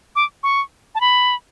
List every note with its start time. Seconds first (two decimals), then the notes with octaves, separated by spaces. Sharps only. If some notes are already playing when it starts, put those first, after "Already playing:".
0.16 D6
0.43 C#6
0.95 A5
1.01 B5